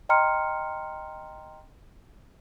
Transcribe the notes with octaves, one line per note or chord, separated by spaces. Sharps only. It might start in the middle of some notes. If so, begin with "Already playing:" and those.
D#5 G5 A#5 C6 F6 C#7